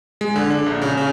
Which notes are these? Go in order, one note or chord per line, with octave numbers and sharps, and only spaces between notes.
G#3
D3
D4
A#1
C#3
C#3